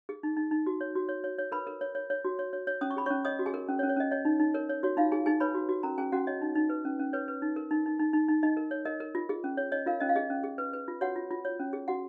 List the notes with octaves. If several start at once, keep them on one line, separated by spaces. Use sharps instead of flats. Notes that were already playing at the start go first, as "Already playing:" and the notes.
G#4
D#4
D#4
D#4
F#4
C#5
F#4
C#5
C#5
C#5
A#4 B4 B5
A#4
C#5
C#5
C#5
F#4
C#5
C#5
C#5
C#4 D#6
C#6
G#4 B5
C#4 C#5 C#6
C#5 D#5 D#6
F#4
G#4 G#5
A#4
C#4
C#5
C#4
C#5
C#4 D#5
C#5 D#5
D#4
D#4
A#4 C#5
C#5
F#4 C#5
D#4 F4 F5
D#4 G#4 G#5
D#4 G#4 G#5
B4 C#5 B5
F#4
F#4
C#4 A#4 A#5
C#4 G#4 G#5
C#4 F#4 F#5
C#5 D#5
D#4
D#4
B4
C#4
C#4
B4 C#5
B4
D#4
A#4
D#4
D#4
D#4
D#4
D#4
D#4 D#5
A#4
C#5
A#4 D#5
A#4
F4
G#4
C#4
C#5
C#5 D#5
F4 A#4 F5
C#4 D#5
F5
G#4 D#5
C#4
G#4
B4
B4
F4
F#4 C#5 F#5
F4
F4
C#5
C#4
G#4
F#4 F#5